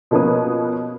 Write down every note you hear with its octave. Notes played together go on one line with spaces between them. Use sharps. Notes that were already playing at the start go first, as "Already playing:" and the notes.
B2 F3 A#3 C#4 B4 D#6